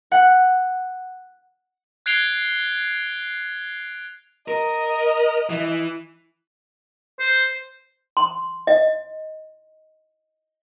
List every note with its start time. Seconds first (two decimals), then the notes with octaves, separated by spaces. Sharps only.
0.12 F#5
2.06 F#6 G#6 C7 D7 F7 G7
4.48 A#4 D#5
5.49 E3
7.20 C5
8.17 C6
8.67 D#5